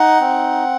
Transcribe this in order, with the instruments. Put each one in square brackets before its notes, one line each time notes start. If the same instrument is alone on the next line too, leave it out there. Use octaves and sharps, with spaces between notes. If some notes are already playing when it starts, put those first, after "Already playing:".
Already playing: [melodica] D#4 F#5
C4